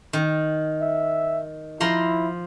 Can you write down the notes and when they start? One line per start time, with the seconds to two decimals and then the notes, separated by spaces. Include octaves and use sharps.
0.13 D#3
0.82 E5
1.80 F3 E4 A#5 C6